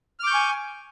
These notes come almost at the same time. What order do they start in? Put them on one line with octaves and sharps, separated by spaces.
F6 D6 G6 C#6 G#5